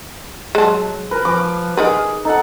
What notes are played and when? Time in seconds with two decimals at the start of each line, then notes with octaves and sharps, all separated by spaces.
0.55 F#3 G#3 A5
1.11 A#4 B4
1.25 F3 D6
1.77 D#4 G#4 A#4 B4
2.25 D#4 A4 F#5